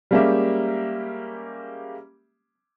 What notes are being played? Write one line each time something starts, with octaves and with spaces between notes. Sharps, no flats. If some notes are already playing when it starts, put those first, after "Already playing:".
G3 G#3 A#3 C#4 G4 E5